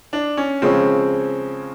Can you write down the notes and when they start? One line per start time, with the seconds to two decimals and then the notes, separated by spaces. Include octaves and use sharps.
0.13 D4
0.37 C#4
0.62 C#3 F3 G#3 C4 C#4